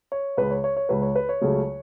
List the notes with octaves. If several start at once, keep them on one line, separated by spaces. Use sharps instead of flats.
C#5
C#2 C#3 G#3 B4
C#5
C#5
C#5
C#2 C#3 G#3 B4
C#5
B4
C#5
C#2 C#3 F#3 A3